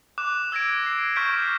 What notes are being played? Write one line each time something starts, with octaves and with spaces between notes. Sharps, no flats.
D6 F#6 E7
E6 G#6 A#6 D7
E6 C7
C#6 F6 G6 B6 D7